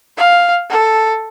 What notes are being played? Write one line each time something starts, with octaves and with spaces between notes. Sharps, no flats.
F5
A4